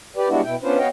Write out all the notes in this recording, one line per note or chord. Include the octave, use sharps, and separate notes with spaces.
G4 B4 D5
G3 G#3 B3 D4 E4 F#4
B2 E4 G5
B3 C#4 D4 F4 B4 C5
B3 F#4 C#5 D#5 F5 G5